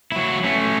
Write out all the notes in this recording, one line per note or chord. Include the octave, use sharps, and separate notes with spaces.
F#3 E4
A3 C#4